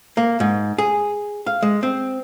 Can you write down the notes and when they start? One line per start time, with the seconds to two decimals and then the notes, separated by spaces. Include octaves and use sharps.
0.17 A#3
0.40 G#2
0.78 G#4
1.47 F5
1.62 G#3
1.83 C4